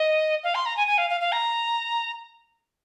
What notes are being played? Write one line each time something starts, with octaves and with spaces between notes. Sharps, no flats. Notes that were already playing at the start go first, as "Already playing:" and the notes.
Already playing: D#5
F5
C6
A#5
G#5
G#5
F5
F5
F5
A#5